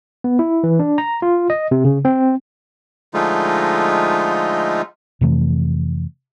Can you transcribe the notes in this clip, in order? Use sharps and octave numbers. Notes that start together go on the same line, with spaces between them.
B3
E4
E3
D4
A#5
F4
D#5
C3
C#3
C4
D3 F3 G#3 A3 D#4 F4
F2 C3 E3 A3